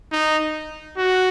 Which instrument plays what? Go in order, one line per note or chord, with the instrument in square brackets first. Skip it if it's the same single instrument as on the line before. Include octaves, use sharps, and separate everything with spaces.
[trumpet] D#4
F#4